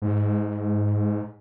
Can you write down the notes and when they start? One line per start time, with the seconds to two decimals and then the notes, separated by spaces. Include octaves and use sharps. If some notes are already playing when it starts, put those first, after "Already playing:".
0.02 G#2